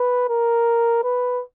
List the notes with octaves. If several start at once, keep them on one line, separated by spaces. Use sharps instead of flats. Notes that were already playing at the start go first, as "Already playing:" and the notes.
Already playing: B4
A#4
B4